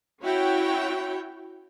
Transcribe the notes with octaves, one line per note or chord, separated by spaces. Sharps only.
C#4 E4 F#4 C#5 G5